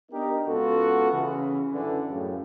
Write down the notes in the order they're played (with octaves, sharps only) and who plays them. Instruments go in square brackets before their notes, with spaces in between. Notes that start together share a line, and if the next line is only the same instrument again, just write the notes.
[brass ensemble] B3 D4 D#4 G4 A#4
C#2 B3 F4 F#4 A4
C#3 E3
F#2 D3 E3
F#2 A2 C#3